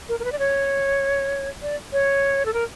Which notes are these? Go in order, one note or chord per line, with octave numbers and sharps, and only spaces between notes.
A#4
A#4
B4
D5
C#5
D5
C#5
A4
A#4